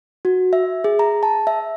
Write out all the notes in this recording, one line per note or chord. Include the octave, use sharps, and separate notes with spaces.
F#4
E5
G#4
A#5
A5
E5